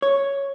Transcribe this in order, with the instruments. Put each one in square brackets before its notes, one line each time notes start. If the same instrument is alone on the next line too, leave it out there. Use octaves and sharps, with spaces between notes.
[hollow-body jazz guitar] C#5